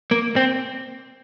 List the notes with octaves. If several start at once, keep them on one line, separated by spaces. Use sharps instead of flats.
A#3
C4